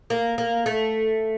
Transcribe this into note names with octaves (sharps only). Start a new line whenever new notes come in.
A#3
A#3
A3